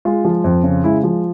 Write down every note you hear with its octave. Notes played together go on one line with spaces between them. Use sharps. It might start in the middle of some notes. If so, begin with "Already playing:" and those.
G#3 F4
F3
F2
C#3
G#3 E4
F3